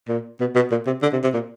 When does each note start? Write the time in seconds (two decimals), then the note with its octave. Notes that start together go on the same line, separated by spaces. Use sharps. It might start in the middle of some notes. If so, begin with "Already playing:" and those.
0.08 A#2
0.40 B2
0.55 B2
0.72 A#2
0.87 C3
1.03 D3
1.13 C3
1.23 C3
1.34 A#2